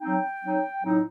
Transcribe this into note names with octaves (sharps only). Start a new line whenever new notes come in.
F#3 C4 D#4 G5
F#3 C4 D#4
A2 F#3 C4 D#4